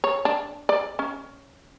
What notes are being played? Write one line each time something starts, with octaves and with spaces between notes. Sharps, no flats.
C#5
D4
D5
C#4